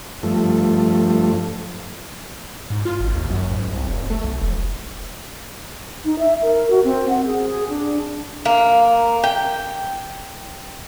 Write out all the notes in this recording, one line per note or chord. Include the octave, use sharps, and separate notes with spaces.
G2 F3 A3
G#2
F4
G#1
D#2
F#2
G#2
C2
F1
A3
B1
F1
D#4
E5
A#4
F#4
C4
F#5
G#4
D4
A#3
G5